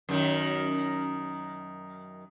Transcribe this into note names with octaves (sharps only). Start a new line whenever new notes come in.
F#2 D#3